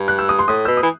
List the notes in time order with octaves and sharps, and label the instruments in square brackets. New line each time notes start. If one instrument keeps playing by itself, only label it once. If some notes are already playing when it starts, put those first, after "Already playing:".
Already playing: [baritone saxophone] G2
[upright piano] F#6
E6
D#6
C6
[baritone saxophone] A2 [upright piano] D#6
[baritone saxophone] B2 [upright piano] E6
[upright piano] D#6
[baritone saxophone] E3